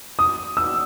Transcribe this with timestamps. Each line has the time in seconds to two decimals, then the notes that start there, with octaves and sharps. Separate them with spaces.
0.19 D#6
0.57 E6